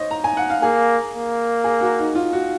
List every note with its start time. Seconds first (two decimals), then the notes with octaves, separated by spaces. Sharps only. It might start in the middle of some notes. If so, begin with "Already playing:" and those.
Already playing: C5 C#5 D#5
0.11 A#5
0.24 G#5
0.37 F#5
0.50 F5
0.62 A#3 G#4
1.14 A#3
1.64 G#4
1.81 F#4
1.99 D#4
2.15 F4
2.33 F#4